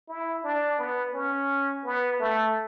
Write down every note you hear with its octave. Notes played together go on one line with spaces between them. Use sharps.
E4
D4
B3
C#4
B3
A3